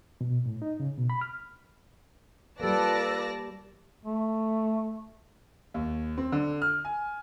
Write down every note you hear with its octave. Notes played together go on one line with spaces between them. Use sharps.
B2
A2
D#4
C#3
B2
B5
F6
G3 A#3 F4 A4 B4 D5 A5 A#6
A3
D#2
C4
D3
F6
G#5